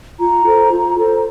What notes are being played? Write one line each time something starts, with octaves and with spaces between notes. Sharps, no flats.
F4 A#5
A4 C5
F4
A4 C5